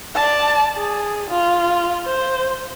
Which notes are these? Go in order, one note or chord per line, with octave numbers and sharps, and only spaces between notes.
D5 A5
G#4
F4
C5